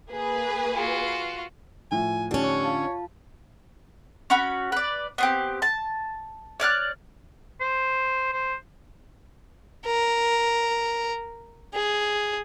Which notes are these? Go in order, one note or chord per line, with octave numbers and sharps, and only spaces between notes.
A#3 G#4 B4
F4 F#4
A2 F3 G#5
D3 C#4 D#4 G4 A5
C#5
F4 F5 A5
C#4 F#4 B5
B4 D5
B3 C4 G4
A5
C#5 D5 F6 F#6
C5
C5
A#4
G#4